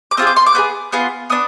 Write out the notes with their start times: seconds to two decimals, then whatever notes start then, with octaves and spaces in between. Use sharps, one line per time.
0.11 D6
0.17 C4 F4 G#4 D#6
0.27 D6
0.37 C6
0.46 D6
0.55 B3 F4 G#4
0.92 B3 F4 G#4
1.30 B3 D4 D#6